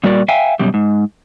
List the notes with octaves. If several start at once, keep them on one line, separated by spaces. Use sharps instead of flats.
A#2 G3 F#4 A#4 D5
E5 F5 G5 G#5
F#2 B2 G3
G#2